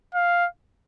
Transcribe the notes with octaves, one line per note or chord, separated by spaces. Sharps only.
F5